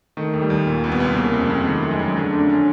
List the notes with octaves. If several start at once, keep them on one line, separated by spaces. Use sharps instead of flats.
D#3 A3
D#2
G3
D#2
A#2
C2
B3
C2
C#3 A#3
F2
F2
D#3 A3
F#2
G#3
F#2
D3 A3
F2 D4
C#4